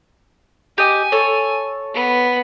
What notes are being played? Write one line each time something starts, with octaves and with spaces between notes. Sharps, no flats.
G4 D#5 G#5
A4 C#5
B3